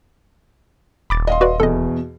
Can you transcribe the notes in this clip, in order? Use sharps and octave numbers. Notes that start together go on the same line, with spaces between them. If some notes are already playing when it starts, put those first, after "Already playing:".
D#1 B5 D6 A6
D#5 F5 C6
F#4 B4 D5
E2 B2 A4 D#5